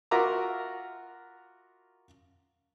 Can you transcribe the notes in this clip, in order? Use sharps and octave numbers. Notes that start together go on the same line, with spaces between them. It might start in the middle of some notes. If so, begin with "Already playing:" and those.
F4 F#4 A#4 E5 A#5 D6